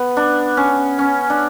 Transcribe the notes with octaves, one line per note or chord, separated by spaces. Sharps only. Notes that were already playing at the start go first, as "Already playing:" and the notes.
Already playing: B3
D4
C#4
C#4
D4